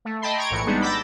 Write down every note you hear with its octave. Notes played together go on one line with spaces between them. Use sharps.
A3
D#5 G5 A5 B5 C6
G5 A#5 C#6 G#6 D7
A#1 A2 E3 C#7
G3 G#3 B3 D4 D#4
B5 D6 E6 G6 A6 A#6